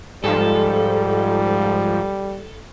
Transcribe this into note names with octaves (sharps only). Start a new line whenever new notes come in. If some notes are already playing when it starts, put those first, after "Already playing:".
G#2 F3 G3 A4